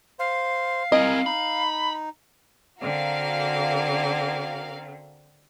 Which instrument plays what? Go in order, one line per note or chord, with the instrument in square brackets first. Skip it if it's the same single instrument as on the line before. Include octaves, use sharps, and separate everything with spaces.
[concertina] C5 [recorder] F5
[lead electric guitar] C4 E4 [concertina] A#4 G#5 [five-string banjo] D#5
[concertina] D#4 [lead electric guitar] B5
[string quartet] D3 C4 [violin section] F#4 A#4 F5